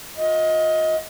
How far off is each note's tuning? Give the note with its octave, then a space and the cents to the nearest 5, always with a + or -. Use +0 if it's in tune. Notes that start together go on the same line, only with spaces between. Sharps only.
F4 +35 D#5 +20